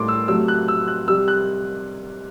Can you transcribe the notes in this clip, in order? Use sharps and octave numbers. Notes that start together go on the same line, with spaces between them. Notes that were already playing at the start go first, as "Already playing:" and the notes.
Already playing: A2 G3 C6 D6
E6
C3 F#3 A3 E6
F#6
E6
F#6
C3 G3 E6
F#6